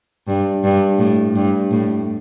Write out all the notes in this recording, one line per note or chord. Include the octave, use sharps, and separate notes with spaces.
G2
G2
A2
G2
A2